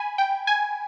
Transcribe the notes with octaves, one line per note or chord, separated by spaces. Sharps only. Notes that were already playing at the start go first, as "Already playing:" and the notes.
Already playing: G#5 B5
G5
G#5